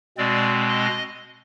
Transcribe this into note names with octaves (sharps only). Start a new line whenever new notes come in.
B2 G#3 C4 D5
D#5